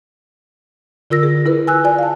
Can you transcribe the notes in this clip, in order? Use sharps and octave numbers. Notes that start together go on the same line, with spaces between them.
D3 F4 A#4 E6 A#6
G#4
E4 A#4 B4
G#5 E6 F#6
F4 D5 G#5
F5 A5